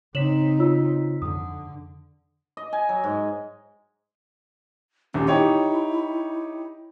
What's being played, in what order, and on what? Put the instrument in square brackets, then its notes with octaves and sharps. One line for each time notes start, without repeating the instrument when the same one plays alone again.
[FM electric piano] C#3 B6 [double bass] C4 D#4 [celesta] C#5 E7 F#7
[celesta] F4 C#5 E6
[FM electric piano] F2 [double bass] D3 [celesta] D#6
[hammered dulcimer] D#5
G#5
F#3
G#2
[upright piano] D#1 D3 [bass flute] C#4
[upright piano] D#4 G4 C#5 [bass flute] E4